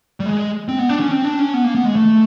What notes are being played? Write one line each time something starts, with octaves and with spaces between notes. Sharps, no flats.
G3
G#3
C4
B3
D4
C#4
C4
D4
C#4
B3
A#3
B3
G#3
A3